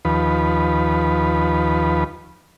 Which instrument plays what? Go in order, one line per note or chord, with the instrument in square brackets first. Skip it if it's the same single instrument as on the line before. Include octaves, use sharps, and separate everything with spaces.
[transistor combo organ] D#2 F3 B4